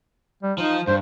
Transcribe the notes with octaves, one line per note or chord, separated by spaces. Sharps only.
G3
F3 D#4
G2 C5